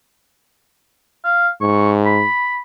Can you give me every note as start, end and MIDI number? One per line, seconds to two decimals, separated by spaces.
1.24 1.48 77
1.61 2.24 44
1.61 1.91 85
2.06 2.60 83